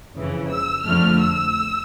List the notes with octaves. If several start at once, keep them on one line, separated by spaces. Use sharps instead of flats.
F2 C#3 E3
E6
F2 D3 F3 A3 F6
E6